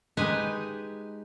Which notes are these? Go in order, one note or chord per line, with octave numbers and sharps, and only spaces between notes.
G#3 D#4 G4 B4 D#5 G#5